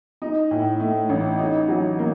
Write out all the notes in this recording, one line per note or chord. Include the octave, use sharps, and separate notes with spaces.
D#4
A2
A3
A1
D#4
F#3
A#3